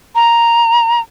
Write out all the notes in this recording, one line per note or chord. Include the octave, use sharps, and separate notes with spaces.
A#5